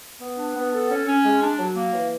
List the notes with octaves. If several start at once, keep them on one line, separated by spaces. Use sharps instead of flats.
B3
D4
B3
A4
C#4
C#4
G#3
D4
F#3
A#3
E3